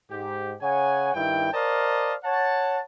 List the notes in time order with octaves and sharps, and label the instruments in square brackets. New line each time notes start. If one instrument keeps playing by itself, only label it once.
[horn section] G#2 G4
C#3 C#5 F#5 G#5
G2 D#3 E4 G5
A#4 C5 D5 D#5 F5 A5
C#5 F#5 A5